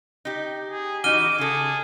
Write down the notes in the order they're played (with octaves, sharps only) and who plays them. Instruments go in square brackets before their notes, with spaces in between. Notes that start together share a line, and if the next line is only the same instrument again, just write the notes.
[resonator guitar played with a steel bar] D#4 G4
[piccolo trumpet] G#4
[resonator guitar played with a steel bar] E3 D#4 F#4 [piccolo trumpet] D6 [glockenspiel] F6 D#7 G7
[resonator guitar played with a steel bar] C#3 A4 [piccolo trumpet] G#4